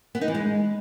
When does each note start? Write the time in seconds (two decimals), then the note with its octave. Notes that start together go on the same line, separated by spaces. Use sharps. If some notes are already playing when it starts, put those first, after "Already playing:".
0.15 B3
0.21 D#4
0.28 E3
0.35 G#3